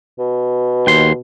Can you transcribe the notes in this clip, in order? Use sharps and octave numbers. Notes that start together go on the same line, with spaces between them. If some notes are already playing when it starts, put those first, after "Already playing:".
B2
D#2 C6